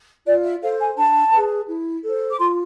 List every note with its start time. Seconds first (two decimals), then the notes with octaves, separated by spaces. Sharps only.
0.26 F4 D5
0.44 E5
0.62 A4 C5 F5
0.80 G#5
0.98 D4 A5
1.32 G#4 B4
1.68 E4
2.03 A4 C5
2.30 D6
2.38 F4 C6